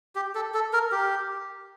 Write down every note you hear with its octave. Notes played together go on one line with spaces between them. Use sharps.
G4
A4
A4
A#4
G4